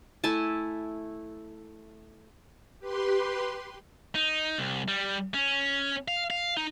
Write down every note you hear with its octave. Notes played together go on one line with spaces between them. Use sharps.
A3 E4 G#5 A5
G4 B4 C6
D#4
C2
G3
C#4
F5
F5
D#4